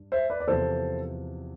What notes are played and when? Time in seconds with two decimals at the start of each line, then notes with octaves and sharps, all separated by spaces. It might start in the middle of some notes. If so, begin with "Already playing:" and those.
Already playing: G2
0.12 C5 E5
0.30 B4 D5
0.40 D5
0.48 E2 C3 F3 A4 C5